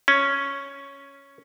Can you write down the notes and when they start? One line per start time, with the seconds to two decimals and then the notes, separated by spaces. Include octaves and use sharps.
0.08 C#4